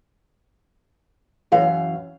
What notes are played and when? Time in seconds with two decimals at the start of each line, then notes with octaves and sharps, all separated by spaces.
1.52 F#2 E3 F5